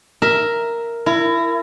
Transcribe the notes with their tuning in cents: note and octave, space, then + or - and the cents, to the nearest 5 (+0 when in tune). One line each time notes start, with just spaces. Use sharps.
A#4 +0 E5 +0
E4 +25 A#4 -15